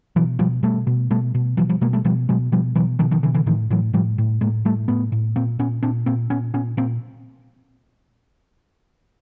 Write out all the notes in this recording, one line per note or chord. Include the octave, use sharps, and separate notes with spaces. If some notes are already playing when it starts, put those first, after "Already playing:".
B2 E3 F#3
B2 F3 G3
B2 G3 A3
B2
B2 G3 A3
B2
B2 E3 F#3
F3 G3
B2 G#3 A#3
G3 A3
B2 F3 G3
B2 F#3 G#3
B2 F3 G3
B2 E3 F#3
B2 D#3 F3
D#3 F3
B2 D3 E3
D3 E3
A2 D#3 F3
A2 E3 F#3
A2 F3 G3
A2
A2 G#3 A#3
A2 G3 A3
A2 A3 B3
A2
A#2 A#3 C4
A#2 B3 C#4
A#2 C4 D4
A#2 A#3 C4
A#2 B3 C#4
A#2 B3 C#4
A#2 A#3 C4